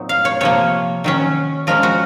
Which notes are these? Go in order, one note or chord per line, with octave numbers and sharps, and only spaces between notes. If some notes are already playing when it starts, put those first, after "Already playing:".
Already playing: A#2 F#3 C4 D#4
F5
C#5
C3 F3 A#3 C#5
D#3 F#3 C#4
F3 G#3 C#4 A#4
F#4